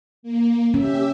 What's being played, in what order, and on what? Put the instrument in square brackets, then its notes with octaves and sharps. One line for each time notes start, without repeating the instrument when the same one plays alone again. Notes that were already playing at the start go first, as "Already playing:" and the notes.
[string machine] A#3
[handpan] C#4 [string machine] G4 E5